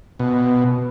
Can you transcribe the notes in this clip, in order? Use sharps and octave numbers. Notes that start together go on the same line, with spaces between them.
B2